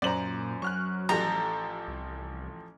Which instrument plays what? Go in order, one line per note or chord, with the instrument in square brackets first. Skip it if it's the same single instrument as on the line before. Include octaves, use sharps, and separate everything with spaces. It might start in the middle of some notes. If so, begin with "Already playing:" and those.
[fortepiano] F#2 C5 A#5 [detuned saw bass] A#2 [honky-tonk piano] D5 F#7
[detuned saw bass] F#3 [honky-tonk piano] C#6 F6 F#6
[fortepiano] A1 [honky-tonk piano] F3 G4 A4 [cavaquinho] A#5
[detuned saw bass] C2